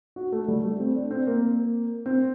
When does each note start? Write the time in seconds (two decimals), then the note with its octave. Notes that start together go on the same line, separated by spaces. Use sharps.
0.16 F#4
0.32 A3
0.48 G3
0.64 A3
0.80 C4
0.95 D4
1.11 C4
1.27 A#3
2.06 C4